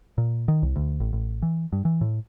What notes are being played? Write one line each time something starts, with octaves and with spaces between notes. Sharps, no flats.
A#2
D#3
C2
D2
A1
A1
E3
G2
E3
A2